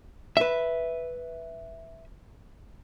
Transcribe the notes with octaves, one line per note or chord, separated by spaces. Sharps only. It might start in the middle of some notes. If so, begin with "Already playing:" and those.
B4 E5